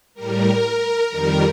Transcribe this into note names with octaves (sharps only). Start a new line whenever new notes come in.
A2 G3 A#4
F2 D#3 G3 A#4